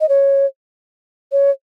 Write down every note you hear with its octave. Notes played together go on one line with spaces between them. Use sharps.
D#5
C#5
C#5